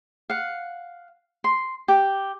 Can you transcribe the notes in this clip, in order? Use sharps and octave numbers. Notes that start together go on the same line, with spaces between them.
F5 F#5
C6
G4